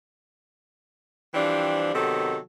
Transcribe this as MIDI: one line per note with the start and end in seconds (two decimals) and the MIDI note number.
1.35 1.93 52
1.35 1.93 53
1.35 1.93 55
1.35 1.93 60
1.35 1.93 62
1.94 2.37 48
1.94 2.37 51
1.94 2.37 54
1.94 2.37 59
1.94 2.37 69